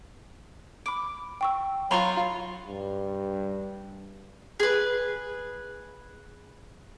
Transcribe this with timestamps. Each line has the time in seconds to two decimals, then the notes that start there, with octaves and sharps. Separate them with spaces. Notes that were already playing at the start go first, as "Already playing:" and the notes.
0.86 B5 D6 D7
1.41 G5 C#6 E6
1.91 F#3 F4 C5 A#5 B5 C#6 G7
2.67 G2
4.60 G#4 B4